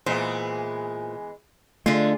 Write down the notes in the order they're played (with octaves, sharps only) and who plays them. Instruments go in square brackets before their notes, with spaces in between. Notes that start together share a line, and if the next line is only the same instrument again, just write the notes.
[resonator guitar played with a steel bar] A#2 C5 [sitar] E3 G#3 B3
[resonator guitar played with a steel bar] D3 F4 [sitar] G#3 [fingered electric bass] A3